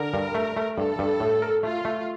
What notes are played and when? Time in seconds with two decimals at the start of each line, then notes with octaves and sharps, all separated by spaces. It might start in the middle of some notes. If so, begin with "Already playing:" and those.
Already playing: D3 A#4
0.14 G2
0.35 A3
0.57 A3
0.77 G2 A4
0.99 G2
1.20 A2
1.42 A#4
1.63 A3 F4
1.85 A3